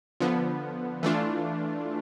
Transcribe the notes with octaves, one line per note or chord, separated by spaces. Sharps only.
D3 F3 B3
E3 A3 D4 F4